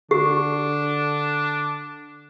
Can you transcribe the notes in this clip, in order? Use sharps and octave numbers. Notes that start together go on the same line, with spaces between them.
D3 D4 G4